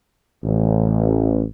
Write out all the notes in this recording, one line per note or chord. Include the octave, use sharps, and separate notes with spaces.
A1